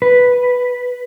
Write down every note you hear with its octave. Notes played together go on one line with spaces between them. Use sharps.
B4